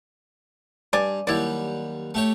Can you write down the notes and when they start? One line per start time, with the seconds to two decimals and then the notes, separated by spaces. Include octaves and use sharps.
0.93 G2 D5 G5 G#5
1.27 D#2 F#3 G3 E4 D5
2.14 A3 G4 C#5